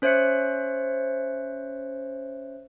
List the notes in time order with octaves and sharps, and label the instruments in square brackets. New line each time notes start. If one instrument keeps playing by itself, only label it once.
[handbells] C#4 C5 C#5 E5 F#6 C#7